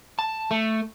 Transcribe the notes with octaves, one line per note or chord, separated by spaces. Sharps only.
A5
A3